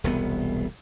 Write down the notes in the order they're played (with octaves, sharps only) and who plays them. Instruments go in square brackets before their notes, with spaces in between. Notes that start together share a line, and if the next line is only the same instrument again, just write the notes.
[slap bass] E1 C2 B3